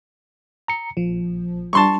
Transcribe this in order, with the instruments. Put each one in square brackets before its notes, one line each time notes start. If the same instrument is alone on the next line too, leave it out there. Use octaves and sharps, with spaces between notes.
[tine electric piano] A#5 C#7
[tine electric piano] A#1 [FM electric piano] F3
[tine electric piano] G3 D4 [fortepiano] A5 C6 C#6